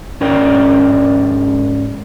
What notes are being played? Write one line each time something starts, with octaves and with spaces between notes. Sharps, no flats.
G#2 C#4 A#4 D5 G5